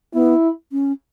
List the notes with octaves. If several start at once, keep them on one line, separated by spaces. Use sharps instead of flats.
B3 E4
C#4